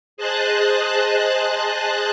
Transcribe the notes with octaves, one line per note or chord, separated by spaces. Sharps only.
G#4 C5 D#5 A5 F#6